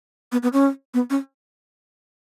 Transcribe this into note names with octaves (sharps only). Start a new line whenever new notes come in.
B3
B3
C#4
B3
C#4